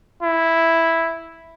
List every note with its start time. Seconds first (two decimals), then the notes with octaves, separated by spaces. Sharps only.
0.23 E4